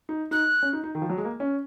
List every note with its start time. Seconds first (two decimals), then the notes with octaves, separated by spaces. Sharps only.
0.09 D#4
0.31 D#4 F#6
0.63 C#4
0.73 D#4
0.84 D#4
0.95 D#3
1.02 F3
1.10 F#3
1.17 G#3
1.25 A#3
1.40 C#4